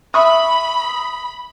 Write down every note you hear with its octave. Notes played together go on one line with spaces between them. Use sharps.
E5 B5 C#6 D#6